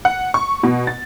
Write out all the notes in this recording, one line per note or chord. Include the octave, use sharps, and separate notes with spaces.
F#5
C#6
B2
A6